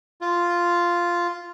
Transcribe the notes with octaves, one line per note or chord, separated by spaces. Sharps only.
F4